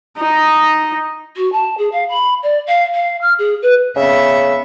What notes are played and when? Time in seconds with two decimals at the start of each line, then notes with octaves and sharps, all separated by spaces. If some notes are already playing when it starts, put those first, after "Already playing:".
0.18 D#4 D#5
1.36 F#4
1.52 A5
1.77 G#4
1.91 F5
2.09 B5
2.42 D5
2.66 F5
2.94 F5
3.21 F6
3.38 G#4
3.62 B4
3.96 C#3 B3 E5